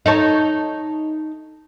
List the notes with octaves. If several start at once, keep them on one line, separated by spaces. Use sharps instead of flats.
D#4 A4 C#5